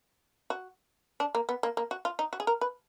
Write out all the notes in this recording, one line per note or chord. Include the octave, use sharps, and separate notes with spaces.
F#4
D4
A#3
B3
A#3
A#3
F#4
F4
D#4
F#4
G#4
A#4
B4